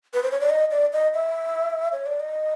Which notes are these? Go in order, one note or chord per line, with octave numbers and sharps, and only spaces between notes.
B4
C5
C#5
D5
D#5
D5
D#5
E5
C#5
D5
D#5